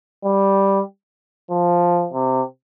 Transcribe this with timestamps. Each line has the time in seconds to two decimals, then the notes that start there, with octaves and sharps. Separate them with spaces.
0.24 G3
1.50 F3
2.13 C3